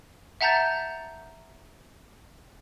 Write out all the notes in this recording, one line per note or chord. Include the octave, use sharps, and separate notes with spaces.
E5 F#5 A5 A#5 G6 A6